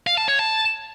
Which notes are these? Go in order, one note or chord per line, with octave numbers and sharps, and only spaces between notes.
F5
A5
C#5
A5